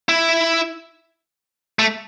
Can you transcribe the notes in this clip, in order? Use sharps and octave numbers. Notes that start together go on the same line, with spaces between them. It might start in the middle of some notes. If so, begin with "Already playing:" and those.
E4
A3